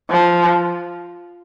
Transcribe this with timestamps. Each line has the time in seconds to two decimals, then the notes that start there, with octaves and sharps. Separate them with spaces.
0.11 F3